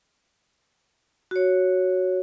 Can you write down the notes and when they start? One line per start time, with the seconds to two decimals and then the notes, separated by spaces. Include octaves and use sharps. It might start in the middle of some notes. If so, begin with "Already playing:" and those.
1.31 F#4 C#5